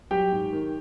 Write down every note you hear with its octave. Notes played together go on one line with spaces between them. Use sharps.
F#3 G4 G5
G#2
D#3